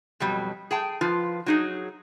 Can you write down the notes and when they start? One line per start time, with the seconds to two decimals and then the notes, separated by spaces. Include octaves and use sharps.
0.20 F2 B2 F#3 G3
0.71 G#4 G5 A5
1.01 F3 F4 B4
1.46 F#3 D#4 G#4